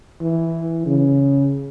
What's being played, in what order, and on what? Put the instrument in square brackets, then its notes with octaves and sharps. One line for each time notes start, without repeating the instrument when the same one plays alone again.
[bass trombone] E3
C#3